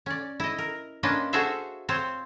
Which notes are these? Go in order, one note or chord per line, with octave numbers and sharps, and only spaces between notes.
C#4 D5
E4 D#5
A#4
A#3 C#4 D4 F4 B4 D#5
F#4 G#4 A4 C5 E5 F5
C4 F4 C5 C#5